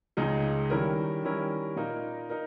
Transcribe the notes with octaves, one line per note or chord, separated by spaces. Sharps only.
C#2 C#3 G#3 D#4 G#4
D#3 G3 C#4 E4 A#4
D#3 G3 C#4 E4 A#4
A#2 A#3 D#4 A#4
D#4 A#4